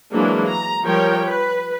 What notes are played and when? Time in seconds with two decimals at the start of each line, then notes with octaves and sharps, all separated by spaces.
0.12 E3 F#3 G#3 A#3 D4
0.49 A#5
0.84 F3 G3 A#4 C#5 G5
1.26 B4